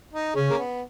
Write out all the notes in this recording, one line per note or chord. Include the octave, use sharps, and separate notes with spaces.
D#4
C#3 C#4
A#3
B3